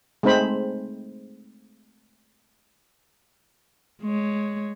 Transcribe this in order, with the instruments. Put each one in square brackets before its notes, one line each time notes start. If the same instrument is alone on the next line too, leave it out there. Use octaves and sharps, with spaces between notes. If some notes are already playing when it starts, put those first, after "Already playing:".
[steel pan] G#3 A3 C4 D#4 C5 B5
[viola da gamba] G#3 C#5